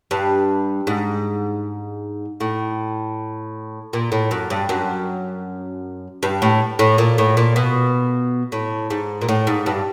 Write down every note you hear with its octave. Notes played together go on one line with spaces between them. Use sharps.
G2
G#2
A2
A#2
A2
F#2
G2
F#2
G2
A2
A2
A#2
A2
A#2
B2
A2
G#2
A#2
A2
G#2
G2